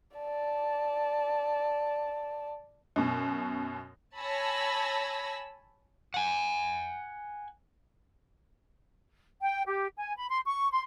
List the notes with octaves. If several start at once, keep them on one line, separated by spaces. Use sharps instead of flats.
D5 A5
F#2 B2
C#5 G#5 A5 B5 E6 A#6
F#5 G#5
G5
G4
G#5
B5
C6
C#6
C6